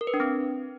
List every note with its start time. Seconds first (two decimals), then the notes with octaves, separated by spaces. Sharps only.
0.01 A#4
0.07 B4
0.14 D4
0.20 C4